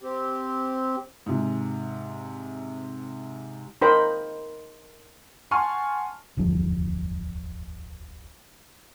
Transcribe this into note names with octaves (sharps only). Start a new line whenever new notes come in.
C4 G4
G#2 C3
D#4 A#4 C5 D#5 G5 B5
F#5 G#5 A5 C6 C#6 F6
D1 G1 E2 F3